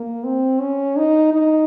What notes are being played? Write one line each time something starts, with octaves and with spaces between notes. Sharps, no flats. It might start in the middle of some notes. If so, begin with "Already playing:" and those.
Already playing: A#3
C4
C#4
D#4
D#4